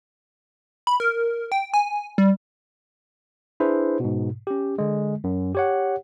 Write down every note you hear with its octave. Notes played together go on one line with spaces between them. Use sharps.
B5
A#4
G5
G#5
G3
D4 E4 G#4 B4 C5
G#2 B2
C#4 G4
D3 G#3
F#2
G4 C#5 F#5